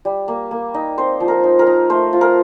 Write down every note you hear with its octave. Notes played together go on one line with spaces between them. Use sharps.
G3
A#3
A#3
D#4
C4 C5
F3
A#4
D#4
A#4
D#4
A3 C5
F4
A#4